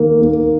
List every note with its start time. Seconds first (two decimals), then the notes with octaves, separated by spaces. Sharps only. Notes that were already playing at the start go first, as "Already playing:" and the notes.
Already playing: D#3 A#3
0.21 A#3